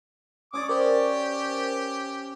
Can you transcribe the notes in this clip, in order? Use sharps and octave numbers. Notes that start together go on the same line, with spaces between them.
C#4 C#5 D5 D6 D#6
G4 A#4 C5